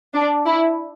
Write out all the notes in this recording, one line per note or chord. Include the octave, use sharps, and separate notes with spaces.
D4
E4